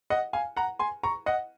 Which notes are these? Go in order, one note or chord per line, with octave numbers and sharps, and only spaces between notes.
D#5 F#5
F5 G#5
F#5 A#5
G#5 C6
A#5 C#6
D#5 F#5